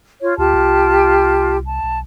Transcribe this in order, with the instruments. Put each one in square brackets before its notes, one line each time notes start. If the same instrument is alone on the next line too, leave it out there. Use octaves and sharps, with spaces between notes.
[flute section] F4 C#5
[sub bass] D2 [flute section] F4 G4 A5
[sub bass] C2
[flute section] A5
[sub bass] B1